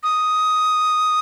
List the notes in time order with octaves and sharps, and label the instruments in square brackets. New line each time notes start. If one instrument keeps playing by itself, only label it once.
[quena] D#6